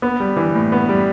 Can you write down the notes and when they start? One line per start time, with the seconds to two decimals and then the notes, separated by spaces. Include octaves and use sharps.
0.02 B3
0.20 G3
0.36 E3
0.55 A2
0.72 B3
0.89 G3